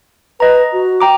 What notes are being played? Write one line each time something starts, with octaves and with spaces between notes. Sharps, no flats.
B4 D#5 A#5
F#4
G5 A#5 D6